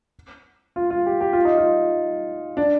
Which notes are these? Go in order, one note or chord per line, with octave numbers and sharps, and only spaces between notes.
F4
F4
G4
G4
F4
D#4
F4
D4